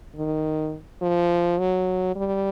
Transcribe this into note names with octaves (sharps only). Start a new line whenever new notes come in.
D#3
F3
F#3
G3